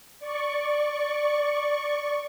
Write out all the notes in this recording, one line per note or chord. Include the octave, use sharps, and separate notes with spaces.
D5 C#6